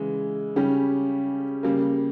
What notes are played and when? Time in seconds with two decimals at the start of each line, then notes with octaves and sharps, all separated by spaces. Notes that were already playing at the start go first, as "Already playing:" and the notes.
Already playing: C#3 E3 G#3
0.56 C#3 G3 C#4 G4
1.63 C#3 G3 A#3